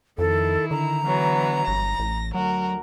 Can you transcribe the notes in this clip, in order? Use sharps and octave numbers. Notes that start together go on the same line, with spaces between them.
F2 D#3 E4 A4
D3 A#5
E3 F#3 B3
G1 A#6
A1
D2 F#3 F#4 A#4